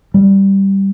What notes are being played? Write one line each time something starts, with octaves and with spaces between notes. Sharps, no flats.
G3